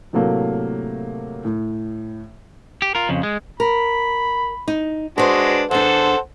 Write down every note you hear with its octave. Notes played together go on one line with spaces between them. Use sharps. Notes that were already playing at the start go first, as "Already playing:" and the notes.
A2 C3 F#3 A3 A#3
A2
G4
F4 A#4
F2 C#3
G#3
A#4 B5
D#4
G#3 D4 F#4 B4 C5
E2 D4 A4 C5 F#5